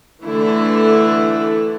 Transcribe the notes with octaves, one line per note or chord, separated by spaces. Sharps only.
D3 E3 A3 E4